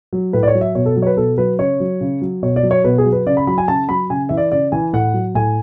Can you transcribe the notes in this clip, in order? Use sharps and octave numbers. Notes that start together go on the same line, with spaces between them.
F#3
A2 B4
D5
C#5
F#3
E5
B2 C#5
A4
F#3
C#5
B4
B2 A4
F#3 B4
C#3 C#5
F#3
C#3
F#3
B2 C#5
D5
F#3
C#5
B2 B4
G#4
F#3
B4
C#3 D5
B5
F#3 B5
G#5
C#3 A5
F#3 B5
C#3 G#5
E3 E5
D5
C#3 D5
E3 G#5
A2 F#5
F#3
A2 G#5